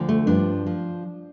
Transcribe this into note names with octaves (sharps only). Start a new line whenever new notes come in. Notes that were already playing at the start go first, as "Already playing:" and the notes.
Already playing: D2 D3 F3
A3
G2 F3 D4
F3